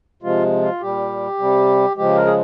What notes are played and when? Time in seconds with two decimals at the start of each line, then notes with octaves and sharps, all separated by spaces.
0.22 C3 F3 G#3 F4
0.61 F4
0.81 A#2 G3 G4
1.39 C3 G3
1.96 C#3 F3 G#3 G4
2.16 A#4
2.26 G#4